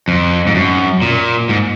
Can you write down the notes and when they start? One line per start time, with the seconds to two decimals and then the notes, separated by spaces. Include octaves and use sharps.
0.08 F2
0.47 G#2
0.55 F#2
1.02 A#2
1.49 G#2